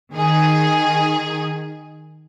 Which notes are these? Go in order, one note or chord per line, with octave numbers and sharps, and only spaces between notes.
D#3 G#4